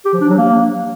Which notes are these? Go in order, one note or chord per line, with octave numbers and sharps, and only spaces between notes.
G4
F3
D4
F#3
A#3